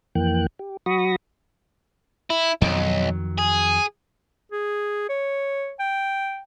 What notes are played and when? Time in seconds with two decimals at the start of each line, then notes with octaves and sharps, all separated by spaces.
0.15 F2 E3 A#3 G5 F#6
0.59 G4
0.86 F#3 F#4 B5 C#6 D#6 A#6
2.30 E4
2.61 B1 F2 D#3 F#3
3.38 G#4
4.52 G#4
5.09 C#5
5.79 G5